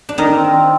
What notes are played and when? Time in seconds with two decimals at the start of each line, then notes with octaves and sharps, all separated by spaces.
0.09 D4
0.18 D#3 D#4 A#4
0.36 C4
0.52 F4